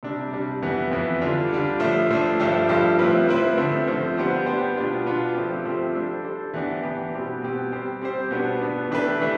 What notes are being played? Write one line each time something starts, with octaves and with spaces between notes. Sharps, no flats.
C3 G3 D4
C3 G3 D4
F2 E3 B3
F2 E3 B3
D3 G3 D4 F4
D3 G3 D4 F4
A2 F3 A3 D4
A2 F3 A3 D4
G2 F3 A3 D4 G4
G2 F3 A3 D4 G4
A2 F3 C4 E4 B4
A2 F3 C4 E4 B4
D3 F3 A3 C4
D3 F3 A3 C4
G3 B3 D4 G4 C5
G3 B3 D4 G4 C5
B2 B3 D4 F4
B2 B3 D4 F4
F3 A3 C4 G4
F3 A3 C4 G4
G3 D4 A4 C5
G3 D4 A4 C5
E3 B3 D4 G4
E3 B3 D4 G4
B2 G3 C4 G4
B2 G3 C4 G4
G3 C4 G4 C5
G3 C4 G4 C5
B2 B3 D4
B2 B3 D4
E3 A3 D4 G4 B4
E3 A3 D4